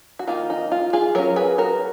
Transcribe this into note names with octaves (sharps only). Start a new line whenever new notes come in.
F#4
D#3 A#3 D#4 F4
D#4
F4
F4 G#4
F#3 C#4 A#4 C#5
G#4 B4
F#4 A#4